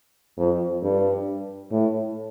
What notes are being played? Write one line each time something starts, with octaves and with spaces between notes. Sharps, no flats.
F2
G2
A2